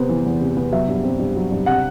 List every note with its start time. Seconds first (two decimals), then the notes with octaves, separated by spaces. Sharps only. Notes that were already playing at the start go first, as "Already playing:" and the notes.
Already playing: C3 B3 C5
0.09 E3
0.26 E2
0.41 C3
0.57 B3
0.72 F#3 E5
0.88 G2
1.03 C4
1.20 G2
1.36 F#3
1.52 G2
1.66 C3 F#5